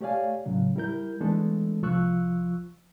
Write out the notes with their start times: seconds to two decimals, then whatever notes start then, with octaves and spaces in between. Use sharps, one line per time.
0.01 A3 G4 C#5 D5 F5 G#5
0.46 A2 C#3 F#3
0.76 G3 E4 A#4 G6
1.21 E3 G#3 A3 B3 D4 A4
1.82 C2 F3 F4 C#6 E6 F#6